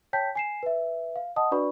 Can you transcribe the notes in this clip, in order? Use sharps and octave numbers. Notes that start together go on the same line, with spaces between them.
C#5 G5 A5 G6 B6
G#5 C7 E7
B4 E5
F5
D#5 F#5 A5 D#6
D4 F#4 B4 D5 B5 C#6